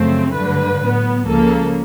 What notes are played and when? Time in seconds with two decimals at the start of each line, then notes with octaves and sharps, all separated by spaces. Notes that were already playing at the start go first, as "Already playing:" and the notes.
Already playing: F#2 C#3 F3 A3 C4
0.34 G2 D3 F#3 B4
0.81 A2 F#3 B3
1.27 C#2 C#3 F3 A#3 A4